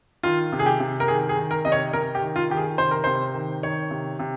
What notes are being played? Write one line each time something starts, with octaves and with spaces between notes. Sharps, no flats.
D#3 F4
C3
G#4
G4
C3
A#4
D#3 G#4
G#4
D#3
A#4
C3 D#5
C#5
C3 A#4
G4
D#3
F4
D#3 G4
G#4
C3 C5
A#4
C3 C5
D#3
D#3 C#5
C3
C3